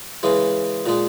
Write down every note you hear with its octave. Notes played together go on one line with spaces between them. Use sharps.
C#3 E3 G#3
A#2 G#3